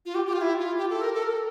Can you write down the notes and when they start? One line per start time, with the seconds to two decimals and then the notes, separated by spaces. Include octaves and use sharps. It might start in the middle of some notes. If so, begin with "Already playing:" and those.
0.05 F4
0.15 G4
0.26 G4
0.33 F4
0.41 E4
0.59 F4
0.77 G4
0.90 A4
1.01 A#4
1.14 A4
1.22 A#4
1.31 A4